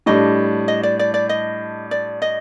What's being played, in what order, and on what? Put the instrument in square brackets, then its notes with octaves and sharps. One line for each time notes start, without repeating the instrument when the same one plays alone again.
[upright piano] A2 G3 D4 [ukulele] D#5
[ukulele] D#5
D5
D5
D5
D#5
D5
D#5